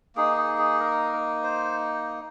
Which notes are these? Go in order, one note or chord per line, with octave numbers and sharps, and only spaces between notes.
A#3 D#4 G#4
G#4
G#4
A#4
C5